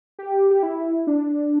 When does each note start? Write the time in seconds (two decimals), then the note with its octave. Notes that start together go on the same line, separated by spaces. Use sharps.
0.19 G4
0.51 G4
0.63 E4
1.07 D4